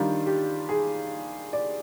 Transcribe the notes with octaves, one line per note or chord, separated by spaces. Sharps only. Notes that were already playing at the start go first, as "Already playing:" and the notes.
Already playing: D#3 G3 D4 F4
G4
G#4
D5